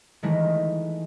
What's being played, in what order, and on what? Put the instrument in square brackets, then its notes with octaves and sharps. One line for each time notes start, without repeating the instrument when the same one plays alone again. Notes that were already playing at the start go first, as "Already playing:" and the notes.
[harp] D#3 E3 G#3 A3